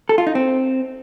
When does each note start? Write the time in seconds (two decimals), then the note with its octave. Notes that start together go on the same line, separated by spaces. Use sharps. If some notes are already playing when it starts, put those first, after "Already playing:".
0.09 A4
0.18 F4
0.27 D#4
0.35 C4